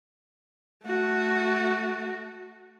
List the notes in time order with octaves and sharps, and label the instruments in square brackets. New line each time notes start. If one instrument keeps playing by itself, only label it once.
[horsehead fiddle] A3 F#4